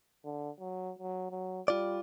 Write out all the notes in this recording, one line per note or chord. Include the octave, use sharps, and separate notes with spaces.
D3
F#3
F#3
F#3
G3 F4 D5